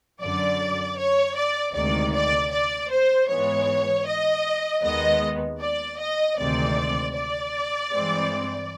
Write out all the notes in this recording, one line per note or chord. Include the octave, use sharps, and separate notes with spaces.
F#2 D3 F#3 D5
C#5
D5
D2 C3 D#3 G#3 D5
D5
D5
C5
G#2 E3 G#3 B3 C#5
D#5
D#2 D#3 G#3 B3 D#5
D5
D#5
D2 C3 D#3 G#3 C4 D5
D5
G2 E3 G#3 C4